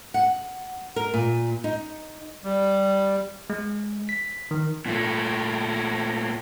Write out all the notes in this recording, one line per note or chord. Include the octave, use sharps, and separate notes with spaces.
F#5
A#4
A#2
D#4
G3
G#3
B6
D#3
A#2 A3